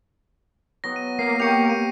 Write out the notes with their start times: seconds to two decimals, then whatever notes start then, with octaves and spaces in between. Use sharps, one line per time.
0.84 F#3 B3 A#6
0.96 D#7
1.19 A#3 C7
1.40 G4 C#6 C#7 F7
1.66 D7 D#7